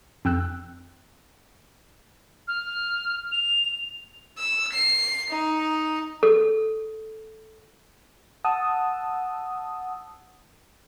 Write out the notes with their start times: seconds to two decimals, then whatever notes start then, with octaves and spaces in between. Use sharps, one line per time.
0.25 F2 G5 E6 F#6
2.48 F6
3.32 F7
4.38 E6
4.72 C7
5.30 D#4
6.23 A4
8.45 F#5 A5 D#6 E6